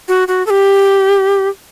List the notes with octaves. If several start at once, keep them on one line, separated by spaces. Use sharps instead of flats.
F#4
F#4
A4
G4